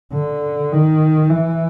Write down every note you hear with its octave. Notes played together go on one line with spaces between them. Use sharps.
D3
D#3
E3